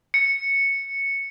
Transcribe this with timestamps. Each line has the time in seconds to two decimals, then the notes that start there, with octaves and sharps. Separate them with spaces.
0.14 C#7